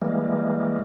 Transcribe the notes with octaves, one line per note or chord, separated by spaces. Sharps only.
E3 G3 G#3 A#3